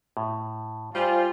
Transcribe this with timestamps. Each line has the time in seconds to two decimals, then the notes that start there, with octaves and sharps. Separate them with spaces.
0.17 A2
0.95 G3 F4 C5 G#5